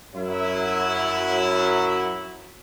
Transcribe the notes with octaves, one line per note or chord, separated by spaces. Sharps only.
F#2 F#3 E4